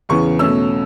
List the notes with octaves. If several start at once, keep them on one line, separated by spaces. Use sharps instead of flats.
E2 C#3 E3 B3 C#6
B2 A3 C#4 E6